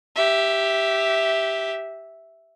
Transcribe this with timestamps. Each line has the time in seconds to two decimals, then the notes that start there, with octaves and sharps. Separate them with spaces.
0.16 G4 E5